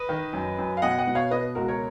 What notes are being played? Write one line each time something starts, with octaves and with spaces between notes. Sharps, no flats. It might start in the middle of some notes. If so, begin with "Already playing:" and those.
Already playing: B4 D#5
D#3
F#2
F#2
F5
B2 D#5 F#5
D#5 F#5
B2
C#5 F5
B2 B4 D#5
C#2 F#4 A#4
A#4 C#5